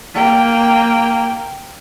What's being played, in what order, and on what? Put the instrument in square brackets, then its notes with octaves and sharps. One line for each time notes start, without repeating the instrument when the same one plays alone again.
[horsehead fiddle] A#3 G5